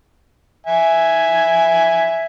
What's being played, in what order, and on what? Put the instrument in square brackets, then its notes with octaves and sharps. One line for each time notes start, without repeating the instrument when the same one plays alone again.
[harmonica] E5 G#5